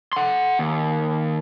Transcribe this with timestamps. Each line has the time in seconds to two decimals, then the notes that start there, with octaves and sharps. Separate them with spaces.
0.13 F#5 C6
0.59 D#2